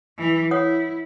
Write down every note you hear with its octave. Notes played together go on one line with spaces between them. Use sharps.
E3
E4 C#5 F#5 D#6